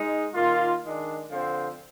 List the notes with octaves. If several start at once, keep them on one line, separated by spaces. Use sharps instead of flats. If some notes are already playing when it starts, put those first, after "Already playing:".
Already playing: G#3 D#4
D#3 A#3 F4
D#3 G#3 D4
D3 F3 C4